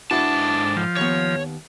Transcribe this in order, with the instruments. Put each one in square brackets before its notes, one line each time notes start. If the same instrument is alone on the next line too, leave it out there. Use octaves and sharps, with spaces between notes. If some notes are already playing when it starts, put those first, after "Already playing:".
[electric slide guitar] G#2 A4 A5 [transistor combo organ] D4 [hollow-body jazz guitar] E4 F#4 B4
[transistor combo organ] F3
[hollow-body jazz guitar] D#2 B3 [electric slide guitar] C#5